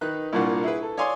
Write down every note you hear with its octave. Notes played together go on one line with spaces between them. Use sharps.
D#3 D#4 B4 F#6
C2 A#2 A#3 D4 F4 F#5
E4 G#4 B4
A4
C#5 D5 F5 G#5 C6 D#6